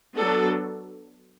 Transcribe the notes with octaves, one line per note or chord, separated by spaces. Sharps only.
F#3 B3 D4 A4